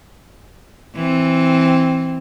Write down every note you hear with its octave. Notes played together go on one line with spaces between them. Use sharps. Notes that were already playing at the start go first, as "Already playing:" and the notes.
E3 C4